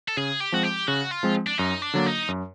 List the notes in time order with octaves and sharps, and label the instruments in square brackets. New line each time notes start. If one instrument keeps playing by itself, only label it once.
[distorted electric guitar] A4
[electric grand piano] C#3 [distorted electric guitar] G#4
[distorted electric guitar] G4
[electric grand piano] F3 G#3 C4 [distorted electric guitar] F#4
[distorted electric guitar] G4
[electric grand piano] C#3 [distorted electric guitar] F#4
[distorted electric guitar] F4
[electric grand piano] F3 G#3 C4
[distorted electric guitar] D4
[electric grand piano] F#2 [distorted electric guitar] D#4
[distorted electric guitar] D4
[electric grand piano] D3 F#3 A#3
[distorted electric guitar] D#4
[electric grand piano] F#2